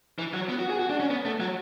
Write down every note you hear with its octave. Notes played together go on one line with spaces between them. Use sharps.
E3
F#3
B3
F#4
G#4
F#4
D4
C#4
B3
A3
F#3